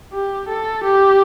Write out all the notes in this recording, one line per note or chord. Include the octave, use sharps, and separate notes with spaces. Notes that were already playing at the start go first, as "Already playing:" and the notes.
G4
A4
G4